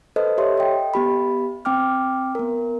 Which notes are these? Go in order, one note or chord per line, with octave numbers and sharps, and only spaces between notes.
A4 B4 C5 D#5
G4 A4 C#5 E5 C6
D#5 G5
B3 G4 B5
C4 G5 D6 F6
B3 A#4